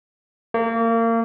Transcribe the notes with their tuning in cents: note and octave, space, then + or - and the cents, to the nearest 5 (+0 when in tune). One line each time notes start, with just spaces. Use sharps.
A#3 -30